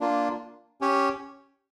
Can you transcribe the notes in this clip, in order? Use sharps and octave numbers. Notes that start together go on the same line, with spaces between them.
A#3 D4 F4
C#4 G4 C#5